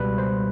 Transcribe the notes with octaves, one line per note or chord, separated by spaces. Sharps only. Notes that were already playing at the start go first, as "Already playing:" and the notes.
Already playing: C#2 B2 G3 B4
C5